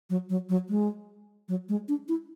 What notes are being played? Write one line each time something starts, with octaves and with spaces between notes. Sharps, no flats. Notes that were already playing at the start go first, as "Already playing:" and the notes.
F#3
F#3
F#3
G#3
F#3
G#3
D4
E4